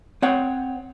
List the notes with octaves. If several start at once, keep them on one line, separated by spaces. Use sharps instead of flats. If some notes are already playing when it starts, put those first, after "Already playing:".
C4 C#5 F#5